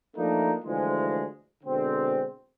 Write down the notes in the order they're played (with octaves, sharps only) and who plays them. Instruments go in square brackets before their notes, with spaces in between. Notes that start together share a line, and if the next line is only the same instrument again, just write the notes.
[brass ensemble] F3 A3 A#3 D4 D#4
D2 E3 F3 G#3
B2 D3 G#3 C4